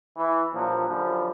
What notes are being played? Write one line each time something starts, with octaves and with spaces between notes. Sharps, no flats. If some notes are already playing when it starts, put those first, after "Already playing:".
E3
G2 A#2 F3 F#3
F#2 D3 F3 G3